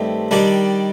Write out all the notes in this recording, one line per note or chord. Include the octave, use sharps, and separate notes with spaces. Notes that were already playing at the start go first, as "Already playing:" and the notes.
Already playing: G2 D#3 A3 C4
D#3 G3 D4